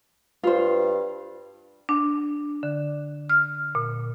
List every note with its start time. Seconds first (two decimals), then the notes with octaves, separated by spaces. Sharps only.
0.43 G2 F4 C5
1.89 D4
2.63 D3
3.29 F6
3.75 A#2